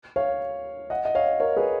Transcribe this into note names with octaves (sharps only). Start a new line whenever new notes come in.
C#5 F5
D#5 F#5
D#5
C#5 F5
A#4 C#5
G#4 B4